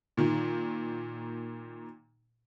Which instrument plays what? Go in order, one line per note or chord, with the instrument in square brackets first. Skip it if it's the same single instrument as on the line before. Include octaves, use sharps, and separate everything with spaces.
[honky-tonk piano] A#2 D#3